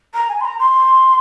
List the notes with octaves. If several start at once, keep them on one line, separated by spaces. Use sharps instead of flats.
A#5
G#5
C6
A#5
C6